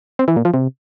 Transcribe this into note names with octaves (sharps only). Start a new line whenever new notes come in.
C4
E3
A#2
F3
C3